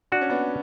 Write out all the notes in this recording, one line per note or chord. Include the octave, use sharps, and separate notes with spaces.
D4 F#4
C#4
B3 D4